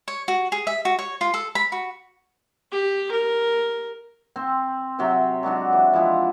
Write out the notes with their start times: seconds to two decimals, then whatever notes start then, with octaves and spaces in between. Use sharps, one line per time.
0.08 C#5
0.28 F#4
0.52 G#4
0.67 E5
0.85 F#4
0.99 C#5
1.21 F4
1.34 A4
1.55 B5
1.72 F#4
2.72 G4
3.11 A#4
4.36 C4 C5
4.99 C3 F#3 C5 G5
5.43 F#3 G#3 D4 F#4
5.73 E3
5.93 F3 G#3 E4